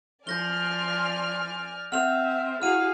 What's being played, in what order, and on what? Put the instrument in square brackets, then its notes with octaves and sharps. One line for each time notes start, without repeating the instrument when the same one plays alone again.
[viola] F3 C6 [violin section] D5 G#5 F6 [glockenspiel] G6 A#6 G7
[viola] C4 E5 [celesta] F#5 [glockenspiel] F6 F7
[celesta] E4 F#5 [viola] F#4 G#4 [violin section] F5 [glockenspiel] F6 D#7